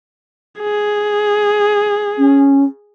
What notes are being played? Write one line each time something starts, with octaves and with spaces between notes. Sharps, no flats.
G#4
C#4